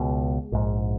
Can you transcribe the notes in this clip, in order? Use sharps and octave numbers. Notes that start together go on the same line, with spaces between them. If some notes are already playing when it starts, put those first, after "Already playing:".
Already playing: C#2 B2 G#3
A#1 G#2